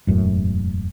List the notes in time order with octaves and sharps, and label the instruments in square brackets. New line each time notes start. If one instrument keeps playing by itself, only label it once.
[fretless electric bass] E1 F#2 A2